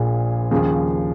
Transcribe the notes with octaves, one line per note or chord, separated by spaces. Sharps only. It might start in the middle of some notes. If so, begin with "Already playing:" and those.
Already playing: A#1 A#2 F3 G#4
D#2 C#3 F3 G#4